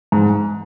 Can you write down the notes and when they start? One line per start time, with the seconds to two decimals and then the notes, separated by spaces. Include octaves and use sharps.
0.12 G#2